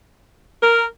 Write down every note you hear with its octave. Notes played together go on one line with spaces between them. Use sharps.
A#4